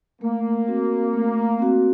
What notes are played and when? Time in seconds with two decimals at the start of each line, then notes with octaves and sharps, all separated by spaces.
0.21 A3 A#3
0.68 C4 F#4
1.13 A3
1.59 C4 F#4